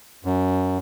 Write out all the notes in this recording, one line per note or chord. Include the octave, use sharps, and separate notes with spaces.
F#2